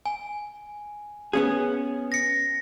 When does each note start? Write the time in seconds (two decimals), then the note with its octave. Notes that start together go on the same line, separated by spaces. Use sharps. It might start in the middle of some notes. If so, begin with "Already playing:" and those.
0.06 G#5
1.33 B3 C#4 G#4
2.12 A#6 C#7